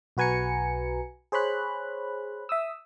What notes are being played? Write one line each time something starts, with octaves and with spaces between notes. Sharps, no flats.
B1 F#4 B4 G#5 A#5 C#7
G#4 C5 C#5 B5 F#6
E5 D#6 E6